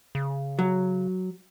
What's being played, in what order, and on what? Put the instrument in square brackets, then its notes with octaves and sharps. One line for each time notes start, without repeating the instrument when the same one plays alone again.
[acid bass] C#3
[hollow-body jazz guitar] F#3